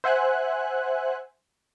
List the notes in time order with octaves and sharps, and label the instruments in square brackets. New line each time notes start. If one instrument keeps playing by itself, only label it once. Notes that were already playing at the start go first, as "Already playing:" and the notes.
[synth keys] C5 E5 F#5 G#5 F#6